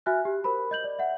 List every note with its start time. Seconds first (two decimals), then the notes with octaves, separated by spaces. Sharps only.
0.06 F#4 E5 G#5 F6 F#6
0.25 G4
0.44 A#4 C5 B5
0.71 D#5 G6 F#7
0.84 D5
0.99 E5 F#5